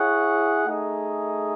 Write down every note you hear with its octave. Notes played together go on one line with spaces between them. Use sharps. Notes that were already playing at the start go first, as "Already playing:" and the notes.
Already playing: E4 G#4 C#5 F#5
A3 D#4 G#4